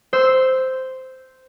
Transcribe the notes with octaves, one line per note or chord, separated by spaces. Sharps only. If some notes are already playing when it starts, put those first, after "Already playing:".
C5 E6